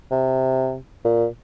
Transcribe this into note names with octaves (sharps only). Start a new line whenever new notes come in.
C3
A#2